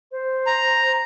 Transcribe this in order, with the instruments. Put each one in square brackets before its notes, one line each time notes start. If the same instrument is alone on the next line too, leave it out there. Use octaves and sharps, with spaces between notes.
[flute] C5
[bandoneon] A#5